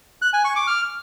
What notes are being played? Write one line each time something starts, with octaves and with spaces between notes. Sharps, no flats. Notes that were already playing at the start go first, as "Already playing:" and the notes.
F#6
G#5
C#6
D6
F6